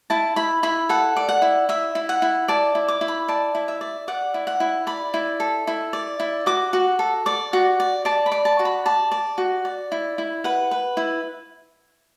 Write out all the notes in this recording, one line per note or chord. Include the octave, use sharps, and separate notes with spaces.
E4 A5
E4 B5
E4 B5
A4 F#5
D5
F#5
E4
E4 E5
E4
F#5
E4
D5 A5
E4
D6
E4
B5
D5 A5
E4
E5
D5
D5 F#5
E4
F#5
E4
D5 B5
E4
A4
E4
D5
E4
F#4 D6
F#4
A4
D5 D6
F#4
D5
D5 A5
B5
D5
A5
F#4
B5
D5 A5
D5
F#4
D5
E4
E4
B4 F#5
B4
E4